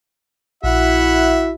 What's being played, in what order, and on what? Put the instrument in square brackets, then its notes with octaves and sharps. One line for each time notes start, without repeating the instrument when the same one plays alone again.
[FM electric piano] A#1 [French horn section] E4 F#4 [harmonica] E5 F#5